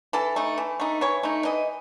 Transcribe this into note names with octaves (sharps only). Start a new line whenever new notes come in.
E3 A4
A3 D#4
E3
A3 D#4
E3 C#5
A3 D#4
E3 D#5